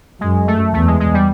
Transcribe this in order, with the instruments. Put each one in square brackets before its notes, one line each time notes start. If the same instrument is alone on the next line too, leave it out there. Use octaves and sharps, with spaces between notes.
[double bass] F#2 [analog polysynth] G#3
[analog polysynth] A3
[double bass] E2 [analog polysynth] A3
[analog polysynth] G#3
G#3
G3